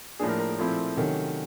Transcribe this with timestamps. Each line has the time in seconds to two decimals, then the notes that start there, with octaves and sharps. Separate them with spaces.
0.19 A2 F3 A#3 D4 G#4
0.29 A#4
0.39 A#4
0.49 G#4
0.58 A#2 F3 A3 C4 E4
0.97 C3 D#3 F#3 A3 C#4